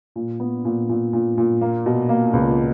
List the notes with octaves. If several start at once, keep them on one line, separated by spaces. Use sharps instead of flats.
A#2
B3
A#2
A#2
A#2
A#2
A#3
B2
A#3
C#2